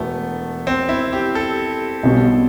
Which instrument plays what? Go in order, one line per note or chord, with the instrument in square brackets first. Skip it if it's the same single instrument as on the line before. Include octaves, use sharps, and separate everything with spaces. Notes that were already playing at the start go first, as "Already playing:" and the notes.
Already playing: [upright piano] E1 E3 [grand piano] A3 B3
[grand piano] C4
E4
G4
A4
[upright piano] B1 B2 G3